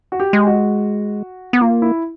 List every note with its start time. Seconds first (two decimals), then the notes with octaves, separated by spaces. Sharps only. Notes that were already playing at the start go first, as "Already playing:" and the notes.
0.12 F#4
0.20 G4
0.33 G#3
0.47 F#4
1.53 B3
1.61 A#3 F4
1.82 E4